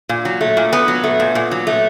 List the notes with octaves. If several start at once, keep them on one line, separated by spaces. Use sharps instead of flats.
A#2
F#3
A3
A#2
A#2 B3
F#3
A3
A#2
A#2
F#3
A3